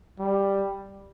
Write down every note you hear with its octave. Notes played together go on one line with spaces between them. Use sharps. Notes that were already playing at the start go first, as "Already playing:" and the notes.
G3